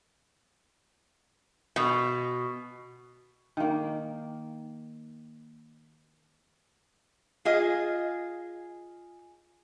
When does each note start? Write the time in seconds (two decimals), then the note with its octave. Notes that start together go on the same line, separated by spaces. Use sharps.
1.76 B2
3.57 D#3 A#3
7.45 F4 G#4 D#5